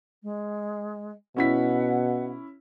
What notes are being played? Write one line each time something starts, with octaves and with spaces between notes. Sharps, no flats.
G#3
B2 C#4 E4 F#5 B6